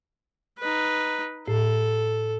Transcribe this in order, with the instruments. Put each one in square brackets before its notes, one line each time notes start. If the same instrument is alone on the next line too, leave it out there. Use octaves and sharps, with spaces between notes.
[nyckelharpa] D#4 B4
[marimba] A2 [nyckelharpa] A4